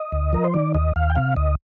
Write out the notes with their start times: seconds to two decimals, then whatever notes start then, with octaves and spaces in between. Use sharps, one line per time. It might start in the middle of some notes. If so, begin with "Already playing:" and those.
Already playing: D#5
0.12 D2
0.33 F3 A#4
0.44 C5
0.54 D#3 D5
0.74 D#2 D#5
0.96 D#2 F5
1.10 G5
1.16 C3 F5
1.36 D2 D#5